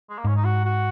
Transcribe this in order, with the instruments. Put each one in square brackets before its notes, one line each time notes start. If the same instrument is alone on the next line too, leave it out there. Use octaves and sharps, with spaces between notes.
[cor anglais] G#3
A#3
[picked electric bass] G#2 [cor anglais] C#4
[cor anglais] D#4
F#4
F#4